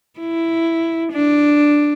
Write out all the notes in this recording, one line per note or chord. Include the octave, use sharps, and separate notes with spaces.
E4
D4